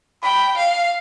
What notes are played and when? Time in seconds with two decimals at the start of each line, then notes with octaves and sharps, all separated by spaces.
0.23 G5 B5
0.57 F5